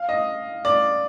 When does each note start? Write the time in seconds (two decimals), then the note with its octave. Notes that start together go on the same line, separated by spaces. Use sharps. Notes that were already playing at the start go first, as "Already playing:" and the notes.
Already playing: F5
0.09 D#5
0.65 D5